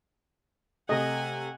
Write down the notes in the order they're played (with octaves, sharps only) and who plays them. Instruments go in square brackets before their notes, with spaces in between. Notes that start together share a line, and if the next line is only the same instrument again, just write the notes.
[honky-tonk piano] C3 A3 [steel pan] D#5 [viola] F#5 G#5